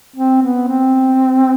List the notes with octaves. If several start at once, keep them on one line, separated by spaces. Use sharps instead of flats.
C4
B3
C4